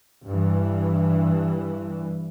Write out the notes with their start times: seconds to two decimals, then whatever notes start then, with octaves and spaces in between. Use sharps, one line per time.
0.26 G2 E3